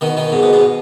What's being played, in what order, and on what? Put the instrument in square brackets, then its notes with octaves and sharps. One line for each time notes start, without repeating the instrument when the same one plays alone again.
[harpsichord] B2 D#3
B2 D#3
G#2 B2
G#2 B2
G#2 B2